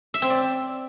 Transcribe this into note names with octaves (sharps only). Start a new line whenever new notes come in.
E5
C4
D5